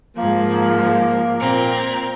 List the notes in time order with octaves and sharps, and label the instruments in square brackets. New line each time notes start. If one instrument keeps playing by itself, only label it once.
[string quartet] G#2 F3 [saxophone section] A#3
[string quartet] A#2 C4 A#4